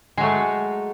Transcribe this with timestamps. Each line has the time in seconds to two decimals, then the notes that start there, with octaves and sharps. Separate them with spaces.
0.18 G#3
0.20 F#3
0.23 A3